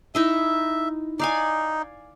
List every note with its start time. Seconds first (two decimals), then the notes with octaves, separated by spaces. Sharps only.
0.15 D#4 E4 D#5 E5
1.19 D#4 D5 F5 G#5